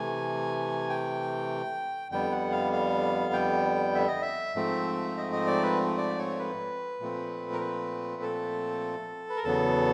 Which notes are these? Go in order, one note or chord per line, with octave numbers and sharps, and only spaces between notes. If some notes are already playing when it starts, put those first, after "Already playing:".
Already playing: C3 E3 A3 G#5
G5
F2 D3 G3 B3 G5
F#5
F5
F5
G5
E5
D#5
E5
G#2 F3 A3 C4
D#5
D#5
D5
B4
D5
C#5
B4
A#2 F3 A3 C4
A#4
B4
A4
B4
A#4
E2 C#3 F#3 B3 A4